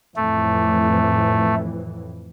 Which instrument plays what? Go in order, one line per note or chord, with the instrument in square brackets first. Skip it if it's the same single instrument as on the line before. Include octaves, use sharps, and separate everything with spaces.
[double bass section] F2 A2 E3 [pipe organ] A3